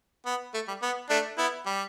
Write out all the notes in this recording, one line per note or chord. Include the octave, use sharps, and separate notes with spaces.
B3
A3
G3
B3
A3 D4
B3 E4
G3